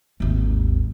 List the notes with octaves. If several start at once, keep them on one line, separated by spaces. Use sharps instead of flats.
G#1 D#2